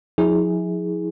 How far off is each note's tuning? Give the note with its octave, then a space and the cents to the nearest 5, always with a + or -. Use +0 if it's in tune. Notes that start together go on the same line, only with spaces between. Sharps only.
F3 +35 E4 -35 G#4 +0